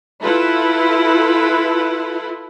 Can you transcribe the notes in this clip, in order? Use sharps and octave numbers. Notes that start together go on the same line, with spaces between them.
E4 F4 A4 B4